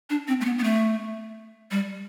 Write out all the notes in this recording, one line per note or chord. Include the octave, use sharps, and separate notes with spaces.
D4
C4
A3
B3
B3
A3
G3